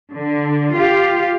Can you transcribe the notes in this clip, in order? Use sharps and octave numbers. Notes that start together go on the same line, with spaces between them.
D3
F4 G4 F5